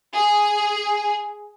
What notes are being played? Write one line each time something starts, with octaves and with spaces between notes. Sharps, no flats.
G#4